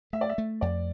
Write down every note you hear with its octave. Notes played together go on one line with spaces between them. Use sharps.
A3 E5
D5
E5
A3
F2 D5